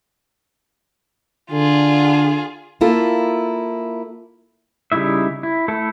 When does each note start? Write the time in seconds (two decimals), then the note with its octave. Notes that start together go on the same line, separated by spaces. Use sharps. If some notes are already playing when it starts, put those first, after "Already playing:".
1.52 D3 F4 G#4
2.81 A#3 E4 F4 A4
4.92 C#3 G3 D#4 E4 E5
5.43 E4
5.68 A3 E4 A4